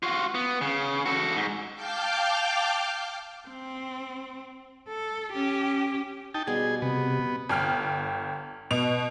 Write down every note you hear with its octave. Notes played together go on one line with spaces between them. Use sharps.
F4 F#4
B3
C#3
F#4 A4
G#2
F5 G5 A5 D6 F6 G6
C4
A4
C#4 G4
D#4 G5 A5
B2 G3 G#4 C6
C3 B3
G1 G5 F6
B2 F7